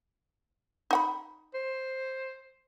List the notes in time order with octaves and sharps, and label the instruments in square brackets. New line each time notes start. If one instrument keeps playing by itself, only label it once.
[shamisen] D#4 F#5 B5
[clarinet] C5